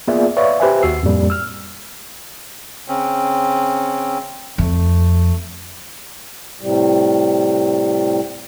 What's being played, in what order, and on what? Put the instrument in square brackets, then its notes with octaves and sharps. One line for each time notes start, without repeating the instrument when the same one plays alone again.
[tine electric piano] A#3 B3 F4 G#4 D5 E5
B4 C#5 D5 E5 F5 C#6
G4 B4 C5 E5 G#5
D#2 F#4 E6 C7
F2 A2 G3 A#3
E6 F6
[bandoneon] C#3 C4 C#4
[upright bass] F2 [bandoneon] A3
[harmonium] A2 C3 G3